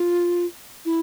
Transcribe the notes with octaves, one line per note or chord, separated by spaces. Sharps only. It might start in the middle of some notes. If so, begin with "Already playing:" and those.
Already playing: F4
E4